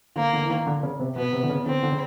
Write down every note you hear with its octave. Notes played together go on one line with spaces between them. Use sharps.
D3 A#3
D3
E3
D#3
D3
C#3
C3
B2 B3
C3
D3
C#3
D3 C4
D3
C#3